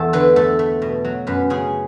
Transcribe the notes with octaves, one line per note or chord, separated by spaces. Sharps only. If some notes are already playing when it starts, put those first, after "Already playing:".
Already playing: E2 A3 A4
D3 B4
A3 A4
A3
B2
F#3
F#2 B4
C#3 G#4